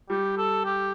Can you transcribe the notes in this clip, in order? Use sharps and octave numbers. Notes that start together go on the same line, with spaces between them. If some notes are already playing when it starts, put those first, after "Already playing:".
G3 G4
A4
G4